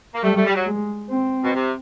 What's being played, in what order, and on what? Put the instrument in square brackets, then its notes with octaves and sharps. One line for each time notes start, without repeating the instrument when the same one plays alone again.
[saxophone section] A#3
[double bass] G3 [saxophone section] A3
[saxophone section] A3
G3
F#3
[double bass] G#3
C4
[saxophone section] B2
C3